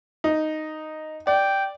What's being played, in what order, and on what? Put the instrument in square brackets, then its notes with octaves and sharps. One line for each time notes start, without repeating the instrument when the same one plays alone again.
[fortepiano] D#4
[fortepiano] D5 [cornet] G5